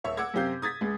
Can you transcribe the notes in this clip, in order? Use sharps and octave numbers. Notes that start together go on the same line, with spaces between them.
D#1 C#5 E5 E6
F#5 D6 E6 G#6
F#2 C3 C4 G4 F5 G6
D#6 G#6 A6 B6
C#2 G#3